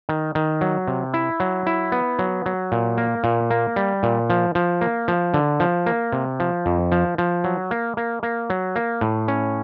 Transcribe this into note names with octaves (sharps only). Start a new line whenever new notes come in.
D#3
D#3
F#3
C3
E4
F#3
E4
B3
F#3
F#3
A#2
A#3
A#2
A#3
G3
A#2
F3
F3
A#3
F3
D3
F3
A#3
C3
F3
F2
F3
F3
F#3
A#3
A#3
A#3
F#3
A#3
A2
C#4